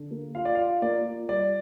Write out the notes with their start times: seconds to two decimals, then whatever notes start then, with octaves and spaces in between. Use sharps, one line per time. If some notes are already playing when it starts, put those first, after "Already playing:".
Already playing: D3
0.11 A#3
0.35 F4 F5
0.45 D5
0.55 F5
0.59 F4
0.82 A#3 D5
1.05 F4
1.29 G3 D5